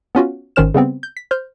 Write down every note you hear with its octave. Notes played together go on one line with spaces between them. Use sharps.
B3 C#4 F4 F#4
G#1 D#3 C#4 C5 F6 E7
C#3 G3 B3 C4
G6
B6
C5 F6 G6